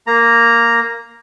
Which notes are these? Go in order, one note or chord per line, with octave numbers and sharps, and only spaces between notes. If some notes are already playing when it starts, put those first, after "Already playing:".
A#3 A#5